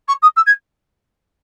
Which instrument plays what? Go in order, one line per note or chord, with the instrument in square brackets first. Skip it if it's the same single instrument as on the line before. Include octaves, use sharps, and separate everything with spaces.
[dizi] C#6
D#6
E6
G#6